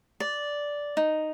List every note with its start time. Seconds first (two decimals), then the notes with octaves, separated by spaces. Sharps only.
0.20 D5
0.97 D#4